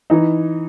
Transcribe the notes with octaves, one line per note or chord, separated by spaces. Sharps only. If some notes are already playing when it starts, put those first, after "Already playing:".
E3 D#4